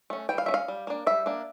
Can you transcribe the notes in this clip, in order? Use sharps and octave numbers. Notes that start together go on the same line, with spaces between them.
A3 C#4
E3 G5
F5
A3 E5
C#4 F5
G3
A#3 D4
G3 E5
A#3 D4